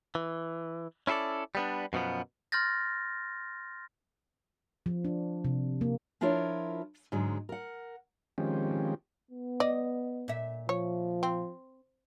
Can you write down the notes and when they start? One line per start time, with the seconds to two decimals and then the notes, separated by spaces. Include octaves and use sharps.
0.15 E3
1.07 C#4 E4 G#4 A4 D5
1.55 G3 B3 D4
1.93 F#2 B2 F3 B3
2.52 C6 F6 G6 A6 A#6
4.86 F3
5.05 D4
5.45 C3
5.81 A#3
6.21 F3 D4 E4 F4 A#4 C#5
7.12 G#2 D3 F#3 G#3
7.49 A#4 F#5
8.38 D#3 F3 G#3 C4 C#4 G4
9.31 B3
9.60 D5 D#5
10.28 A#2 E5
10.69 F3 C#5
11.23 C4